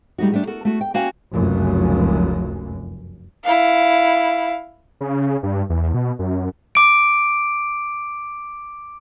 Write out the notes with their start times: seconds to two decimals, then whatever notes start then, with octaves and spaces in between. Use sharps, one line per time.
0.18 G3 A3 D#4 F#4
0.32 G3 A3 D4
0.47 F#4 A4 A#4
0.65 A3 F#4
0.81 G5
0.94 A#3 C#4 F#4 F5 G5 G#5
1.33 F1 C#2 F#2
3.45 E4 F5
5.01 C#3
5.43 G2
5.70 E2
5.94 B2
6.19 F#2
6.75 D6 D7